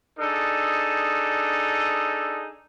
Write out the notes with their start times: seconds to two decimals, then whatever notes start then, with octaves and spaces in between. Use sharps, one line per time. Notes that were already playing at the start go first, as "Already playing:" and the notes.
0.19 D4 D#4 G#4 A4